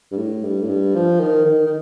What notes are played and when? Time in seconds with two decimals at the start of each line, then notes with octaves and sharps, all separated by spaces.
0.12 G2
0.17 A2
0.44 G2
0.62 A2
0.69 G2
0.95 F3
1.20 D#3
1.46 D#3
1.67 D#3